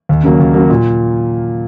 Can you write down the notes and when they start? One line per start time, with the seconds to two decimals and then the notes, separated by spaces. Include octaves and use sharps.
0.09 D#2
0.23 C#3 F#3 A#3
0.40 D#2
0.54 C#3 F#3 A#3
0.70 A#2